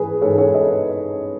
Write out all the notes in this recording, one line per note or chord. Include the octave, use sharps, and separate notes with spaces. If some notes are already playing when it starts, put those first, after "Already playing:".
Already playing: G#2 E3 G#4 B4
G#2 E3 A4 C#5
A4 C#5
B4 D#5